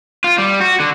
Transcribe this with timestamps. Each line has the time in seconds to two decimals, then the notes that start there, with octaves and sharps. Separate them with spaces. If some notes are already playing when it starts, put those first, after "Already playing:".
0.24 F4
0.38 G3
0.60 F#4
0.80 D3